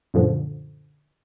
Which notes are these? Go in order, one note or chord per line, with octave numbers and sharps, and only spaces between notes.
F#2 A#2 D3 F3